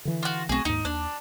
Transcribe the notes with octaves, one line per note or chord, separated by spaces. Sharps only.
D3 E3
F4 F#4
B1 A3 C4 F#4 G#4
D#2 G#2 D#4
D#2 D4